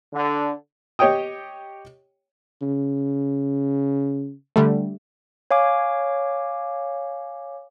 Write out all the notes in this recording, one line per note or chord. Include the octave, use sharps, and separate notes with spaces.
D3
G4 C#5 D#5 G5 D#6
C#3
D3 G3 A3
C#5 F5 G#5 D6